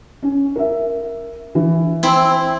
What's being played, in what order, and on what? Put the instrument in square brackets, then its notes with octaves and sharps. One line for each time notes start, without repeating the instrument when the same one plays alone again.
[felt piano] C#4
A#4 E5
E3
[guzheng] C4 E4